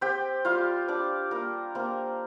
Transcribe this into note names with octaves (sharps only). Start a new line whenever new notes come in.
C4 G4 G5
G3 F4 F5
D4 F4 D5
G3 A#3 A#4
A#3 C4 A#4